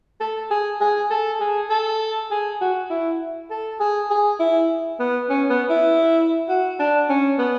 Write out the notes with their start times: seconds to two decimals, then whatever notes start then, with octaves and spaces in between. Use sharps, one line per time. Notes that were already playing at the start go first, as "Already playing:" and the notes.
0.20 A4
0.51 G#4
0.81 G#4
1.11 A4
1.40 G#4
1.70 A4
2.31 G#4
2.61 F#4
2.90 E4
3.50 A4
3.80 G#4
4.10 G#4
4.40 E4
4.99 B3
5.30 C#4
5.50 B3
5.70 E4
6.49 F#4
6.80 D4
7.09 C#4
7.39 B3